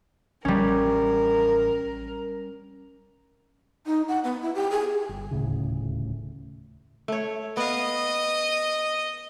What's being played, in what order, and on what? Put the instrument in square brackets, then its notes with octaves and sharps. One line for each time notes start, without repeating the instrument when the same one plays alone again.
[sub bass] A1 [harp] G3 C#4 [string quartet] A#4
[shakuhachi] D#4
F#5
B3
E4
G4
G#4
[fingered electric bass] G1
D#1 D2 A2 C#3
[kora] A3 C#5
[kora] B3 F5 [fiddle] D#5